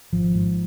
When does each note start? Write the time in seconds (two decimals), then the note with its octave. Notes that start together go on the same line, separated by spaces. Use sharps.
0.12 G#1 F3
0.34 G#2